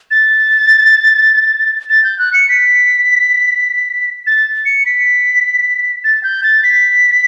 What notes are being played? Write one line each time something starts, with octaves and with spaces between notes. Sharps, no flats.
A6
A6
G6
F#6
C#7
B6
A6
C#7
B6
A6
G6
A6
B6